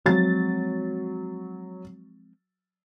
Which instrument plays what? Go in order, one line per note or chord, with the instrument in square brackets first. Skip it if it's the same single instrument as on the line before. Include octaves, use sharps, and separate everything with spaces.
[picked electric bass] F3 G#3 C4 [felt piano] F#3 A6